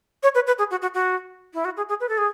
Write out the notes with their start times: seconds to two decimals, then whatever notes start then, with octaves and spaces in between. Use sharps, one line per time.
0.23 C#5
0.35 B4
0.47 B4
0.59 G#4
0.71 F#4
0.82 F#4
0.94 F#4
1.54 E4
1.65 F#4
1.77 G#4
1.89 G#4
2.00 B4
2.09 A4
2.18 G#4